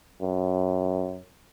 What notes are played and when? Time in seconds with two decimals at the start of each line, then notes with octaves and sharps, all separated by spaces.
0.21 F#2